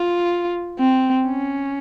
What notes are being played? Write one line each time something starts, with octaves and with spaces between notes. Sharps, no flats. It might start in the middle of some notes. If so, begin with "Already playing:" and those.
Already playing: F4
C4
C#4